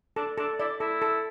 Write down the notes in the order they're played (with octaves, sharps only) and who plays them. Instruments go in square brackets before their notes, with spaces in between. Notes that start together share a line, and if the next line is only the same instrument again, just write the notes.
[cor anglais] D4 [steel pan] A4
[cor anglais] D4 [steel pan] A4
[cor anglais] E4 [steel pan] D5
[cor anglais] E4 [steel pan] A4
[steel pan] A4